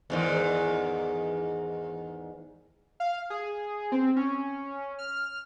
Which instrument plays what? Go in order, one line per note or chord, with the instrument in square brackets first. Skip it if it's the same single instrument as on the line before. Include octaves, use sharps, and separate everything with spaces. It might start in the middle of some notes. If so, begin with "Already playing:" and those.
[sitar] E2 G#2 D#3
[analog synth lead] F5
G#4
C4
C#4
F6